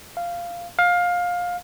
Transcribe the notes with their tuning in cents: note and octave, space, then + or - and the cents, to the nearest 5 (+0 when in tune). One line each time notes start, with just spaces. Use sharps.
F5 -10
F5 +20